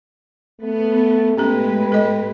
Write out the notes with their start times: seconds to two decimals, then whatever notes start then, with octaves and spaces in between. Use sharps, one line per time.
0.61 A3 B3
1.38 A2 G#3 B3 C#4 G4 A4 B4
1.92 A4 D#5